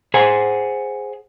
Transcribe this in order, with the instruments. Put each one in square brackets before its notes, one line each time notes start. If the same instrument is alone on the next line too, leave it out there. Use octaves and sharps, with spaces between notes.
[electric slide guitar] G#4 C5 F#5 G#5